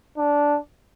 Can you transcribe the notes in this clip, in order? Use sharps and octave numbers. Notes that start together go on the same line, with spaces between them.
D4